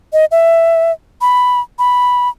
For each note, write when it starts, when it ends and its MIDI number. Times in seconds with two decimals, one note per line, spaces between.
0.13 0.25 75
0.31 0.92 76
1.21 1.60 83
1.79 2.29 83